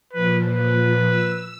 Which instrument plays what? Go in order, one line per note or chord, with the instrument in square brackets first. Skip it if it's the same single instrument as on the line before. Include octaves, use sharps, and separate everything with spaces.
[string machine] A#2 F3 [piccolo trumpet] B4
[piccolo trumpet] B4
[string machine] E6